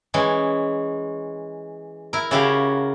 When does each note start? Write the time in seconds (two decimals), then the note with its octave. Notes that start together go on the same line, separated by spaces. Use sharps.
0.14 E3 G#3 C#4
2.13 E4 A#4
2.31 C#3 C#4 E4 F#4 G4 F5